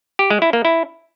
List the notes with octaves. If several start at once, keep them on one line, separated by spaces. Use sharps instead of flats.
G4
G#3
E4
A#3
E4